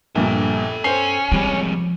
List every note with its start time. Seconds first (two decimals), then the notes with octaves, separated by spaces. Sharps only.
0.15 A#1 G2 A#2 A4 G5
0.84 C#4 C5 C7
1.32 C3 F3 G3 G#3